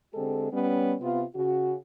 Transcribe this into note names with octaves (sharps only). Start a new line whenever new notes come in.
D3 G#3 C4 G4 A4
G3 B3 C#4
C3 B3 F4
C#3 F#4